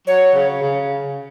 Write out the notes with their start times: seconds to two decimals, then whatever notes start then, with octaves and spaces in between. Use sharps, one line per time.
0.06 F#3 C#5
0.34 C#3
0.62 C#3